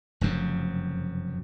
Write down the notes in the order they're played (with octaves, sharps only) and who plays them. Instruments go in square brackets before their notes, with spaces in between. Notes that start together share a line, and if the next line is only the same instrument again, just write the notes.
[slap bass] F1 F#2 C#3